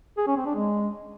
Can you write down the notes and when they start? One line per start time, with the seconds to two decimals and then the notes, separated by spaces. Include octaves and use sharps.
0.18 G#4
0.27 C#4
0.37 C4
0.46 D4
0.55 G#3